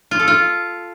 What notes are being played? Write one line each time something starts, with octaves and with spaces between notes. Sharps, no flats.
F4
A4
F4